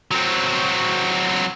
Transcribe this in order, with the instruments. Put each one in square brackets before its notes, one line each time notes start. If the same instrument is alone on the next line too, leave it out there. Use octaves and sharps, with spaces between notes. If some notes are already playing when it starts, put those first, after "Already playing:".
[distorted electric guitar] F#3 C4